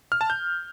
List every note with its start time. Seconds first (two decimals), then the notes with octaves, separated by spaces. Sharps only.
0.12 F6
0.21 A5
0.30 G6